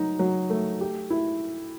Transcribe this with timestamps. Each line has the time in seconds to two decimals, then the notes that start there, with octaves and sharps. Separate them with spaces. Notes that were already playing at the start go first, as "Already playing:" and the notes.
Already playing: F#3 D#4
0.19 F#3
0.50 A3
0.81 G4
1.10 E4